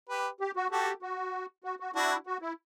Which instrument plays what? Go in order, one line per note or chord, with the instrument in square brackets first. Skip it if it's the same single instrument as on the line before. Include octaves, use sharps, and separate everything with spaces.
[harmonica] G4 B4
[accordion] G4
F#4
[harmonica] F#4 A4 [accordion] G4
[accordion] F#4
F#4
F#4
[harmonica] D4 F#4 [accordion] E4
[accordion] F#4
E4